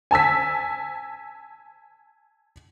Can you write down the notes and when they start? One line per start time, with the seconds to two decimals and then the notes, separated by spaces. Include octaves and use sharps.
0.11 G#5 A5 E6 B6